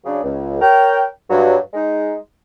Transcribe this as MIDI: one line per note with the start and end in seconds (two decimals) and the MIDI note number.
0.05 0.19 49
0.05 0.19 54
0.05 0.19 62
0.05 0.19 68
0.23 0.57 37
0.61 1.04 70
0.61 1.04 73
0.61 1.04 79
1.30 1.57 43
1.30 1.57 54
1.73 2.15 56
1.73 2.15 63